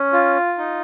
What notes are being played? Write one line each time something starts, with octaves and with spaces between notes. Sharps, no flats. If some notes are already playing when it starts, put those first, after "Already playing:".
Already playing: C#4
F4
D#4